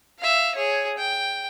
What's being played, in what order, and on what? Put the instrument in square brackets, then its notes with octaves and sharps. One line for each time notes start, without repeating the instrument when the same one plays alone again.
[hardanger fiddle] E5 F5
G#4 C#5
G5